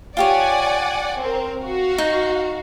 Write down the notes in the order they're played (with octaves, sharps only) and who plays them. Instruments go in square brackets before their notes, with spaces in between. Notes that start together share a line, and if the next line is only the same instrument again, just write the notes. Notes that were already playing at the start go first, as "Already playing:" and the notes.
[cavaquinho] F4 G4 C#5 [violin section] D5 F#5 G#5
[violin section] C4 A#4
F#4 F5
[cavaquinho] D#4